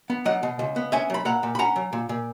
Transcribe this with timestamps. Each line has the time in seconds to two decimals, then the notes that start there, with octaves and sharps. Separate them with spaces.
0.10 B3
0.25 F#3 D#5 F#5
0.43 B2
0.59 C#2
0.76 B3
0.92 C#4 E5 G#5
1.10 F#3 B5
1.25 A#2 F#5 A#5
1.43 A#2
1.55 B5
1.59 C#4 F#5 A#5
1.76 F#3
1.93 A#2
2.09 A#2